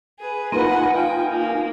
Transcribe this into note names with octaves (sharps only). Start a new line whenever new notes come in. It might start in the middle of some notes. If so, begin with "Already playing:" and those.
G#4 B4
A#3 D#4 F4 B4 D#5 F#5 G#5
F5 G5
A#3